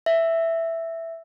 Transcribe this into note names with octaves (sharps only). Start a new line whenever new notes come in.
E5